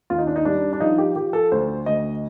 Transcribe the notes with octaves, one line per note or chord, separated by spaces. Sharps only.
D#2 F4
D#4
D4
D#4
G3 D4
D4
F3 D#4
G4
F3 G4
A4
D2 C5
D2 D#5